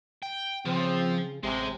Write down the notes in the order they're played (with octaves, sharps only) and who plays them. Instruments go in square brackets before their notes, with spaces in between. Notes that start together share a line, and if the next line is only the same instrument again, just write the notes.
[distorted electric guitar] G5
[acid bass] C#3 [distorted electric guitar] F3 [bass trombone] C4
[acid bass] A1 [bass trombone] C3 [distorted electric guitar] G#3